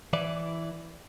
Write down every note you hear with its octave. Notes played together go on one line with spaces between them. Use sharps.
E3 E4 D5